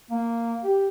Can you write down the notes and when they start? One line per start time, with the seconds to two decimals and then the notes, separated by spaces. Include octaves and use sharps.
0.11 A#3
0.64 G4